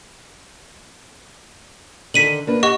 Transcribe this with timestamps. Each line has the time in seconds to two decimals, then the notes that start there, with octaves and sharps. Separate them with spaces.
2.14 D3 D#3 A4 B6 D#7 F#7
2.47 A#3 D4 B4
2.63 G4 D#5 F#5 C#6